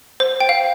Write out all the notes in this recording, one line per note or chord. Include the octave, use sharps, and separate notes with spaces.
C5
G5
F5